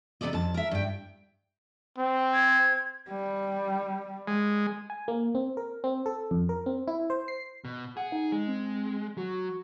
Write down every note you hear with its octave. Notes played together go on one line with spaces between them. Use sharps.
C3 B3 A4 D5 D#5
F2 A5
A#4 E5
G2 G5
C4
G#6
G3
G#3
G#5
A#3
C4
A#4
C4
A4
F2
A#4
C4
E4
C5
C7
B2
G#4 F#5
D#4
G#3
C4
F#3 F#4